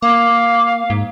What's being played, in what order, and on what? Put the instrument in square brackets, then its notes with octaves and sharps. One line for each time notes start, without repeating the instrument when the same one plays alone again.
[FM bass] A#3 [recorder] F5 [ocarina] D6
[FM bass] G#2